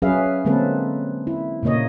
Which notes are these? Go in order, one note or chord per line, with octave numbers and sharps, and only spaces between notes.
F#3 C#4 G#4 B4 E5 F5
D3 G#3 A#3 C4 A4 B4
E4
A#2 C#3 A#3 C#5 D#5